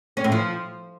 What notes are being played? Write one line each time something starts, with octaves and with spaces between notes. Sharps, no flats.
C#4
A2
F3